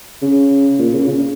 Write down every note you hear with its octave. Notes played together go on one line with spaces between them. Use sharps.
C#3
A#2
C#3
C#3